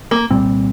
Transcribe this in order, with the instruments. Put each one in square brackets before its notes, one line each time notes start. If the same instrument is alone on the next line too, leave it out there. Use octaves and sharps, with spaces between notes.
[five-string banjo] A#3
[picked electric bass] C2 A#2 G3 C4